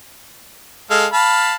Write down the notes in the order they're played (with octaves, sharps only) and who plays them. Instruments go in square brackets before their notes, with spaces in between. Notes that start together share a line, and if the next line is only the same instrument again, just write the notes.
[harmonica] G#3 A4 F5
F5 A5 B5